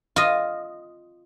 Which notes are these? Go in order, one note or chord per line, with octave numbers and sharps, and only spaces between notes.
F4 D#5